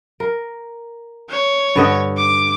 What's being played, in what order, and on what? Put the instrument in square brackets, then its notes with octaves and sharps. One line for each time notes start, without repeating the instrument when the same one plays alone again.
[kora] A#4
[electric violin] C#5
[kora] G2 D3 D#5
[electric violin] D6